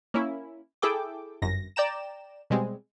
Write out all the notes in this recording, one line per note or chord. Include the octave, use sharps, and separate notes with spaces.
A#3 C#4 E4
E4 G#4 A4 G5 D6
G1 F#2 A#6
D5 G5 A#5 E7
B2 G3 G#3 C4